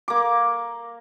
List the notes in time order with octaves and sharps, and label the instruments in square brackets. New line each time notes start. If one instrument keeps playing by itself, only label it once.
[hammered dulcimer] A#3 D6